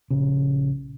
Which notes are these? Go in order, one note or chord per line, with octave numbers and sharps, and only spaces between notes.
A#1 C#3